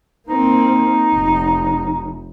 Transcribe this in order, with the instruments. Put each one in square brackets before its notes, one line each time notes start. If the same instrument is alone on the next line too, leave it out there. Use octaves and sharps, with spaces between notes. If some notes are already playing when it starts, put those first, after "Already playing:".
[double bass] A#3 C4 [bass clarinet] D#4
[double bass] F1